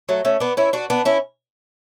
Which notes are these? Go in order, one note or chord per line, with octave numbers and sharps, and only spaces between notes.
F#3 A3
A3 C#4
B3 D4
C#4 E4
D4 F#4
B3 D4
C#4 E4